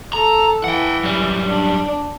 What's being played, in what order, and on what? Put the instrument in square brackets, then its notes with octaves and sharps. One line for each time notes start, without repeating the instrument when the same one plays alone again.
[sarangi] A4 [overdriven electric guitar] A#5
[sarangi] E3 [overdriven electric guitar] F#5 G5
[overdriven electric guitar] F#2 G3
[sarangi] D4